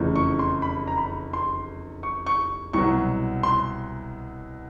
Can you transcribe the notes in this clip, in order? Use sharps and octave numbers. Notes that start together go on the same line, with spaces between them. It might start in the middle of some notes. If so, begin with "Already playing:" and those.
Already playing: F1 E2 C#3
C#6
C6
B5
A#5
B5
C6
C#6
C#6
C2 B2 F#3 C#6
C6